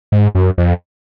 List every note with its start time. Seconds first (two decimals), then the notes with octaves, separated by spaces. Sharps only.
0.12 G#2
0.35 F#2
0.58 F2